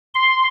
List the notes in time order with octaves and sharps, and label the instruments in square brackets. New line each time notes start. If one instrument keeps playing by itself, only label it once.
[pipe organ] C6